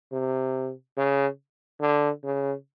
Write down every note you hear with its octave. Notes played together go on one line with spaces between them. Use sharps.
C3
C#3
D3
C#3